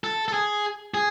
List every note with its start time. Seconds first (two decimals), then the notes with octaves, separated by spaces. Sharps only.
0.04 A4
0.28 A4
0.34 G#4
0.94 G#4